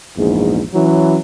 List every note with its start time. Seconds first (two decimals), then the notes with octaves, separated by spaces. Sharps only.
0.17 A#1 E2 G#2
0.74 E3 F#3 C#4